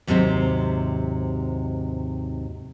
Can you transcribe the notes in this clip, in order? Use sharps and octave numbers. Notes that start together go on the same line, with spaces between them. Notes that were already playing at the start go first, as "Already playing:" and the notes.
D#2 G#2 C3 F#3 C4